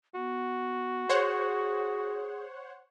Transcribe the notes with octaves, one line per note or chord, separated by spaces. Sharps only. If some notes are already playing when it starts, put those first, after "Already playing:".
B3 F#4
G#4 C5 C#5 F#5